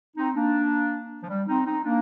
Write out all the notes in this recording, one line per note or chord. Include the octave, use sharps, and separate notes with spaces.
C4 D#4
A#3 D4
F3
G3
C4 D#4
C4 D#4
A#3 D4